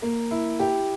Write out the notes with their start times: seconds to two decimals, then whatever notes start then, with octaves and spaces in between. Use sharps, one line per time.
0.02 A#3
0.31 E4
0.60 G4